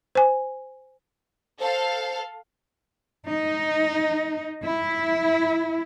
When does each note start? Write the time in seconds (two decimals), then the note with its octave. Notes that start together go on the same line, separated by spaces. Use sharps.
0.15 C5 G#5
1.60 A4 C5 F5
3.27 D#4
4.61 E4